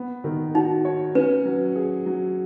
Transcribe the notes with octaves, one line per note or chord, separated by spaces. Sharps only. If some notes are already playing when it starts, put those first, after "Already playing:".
Already playing: B3
D#3
D#4 F#4
C#5
C#4 B4
F#3
G#4
F#3